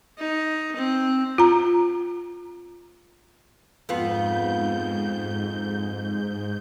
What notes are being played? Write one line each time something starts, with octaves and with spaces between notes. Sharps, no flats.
D#4
C4
F4 A#5
F2 G#2 B3 F4 G6